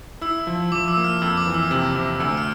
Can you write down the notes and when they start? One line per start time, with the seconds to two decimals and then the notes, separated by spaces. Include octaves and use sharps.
0.21 E4 E6
0.47 F3
0.72 F3 D6
0.88 E6
0.97 A#3
1.04 F6
1.21 F2 E6
1.37 D6
1.47 E3
1.54 E6
1.71 C3 E6
1.95 C3
2.20 D2 E6
2.37 F6